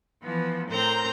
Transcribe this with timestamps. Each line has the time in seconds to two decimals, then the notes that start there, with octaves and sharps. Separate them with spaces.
0.22 E3 F3 B3
0.69 A2 C4 A#4 C5 A#5 G6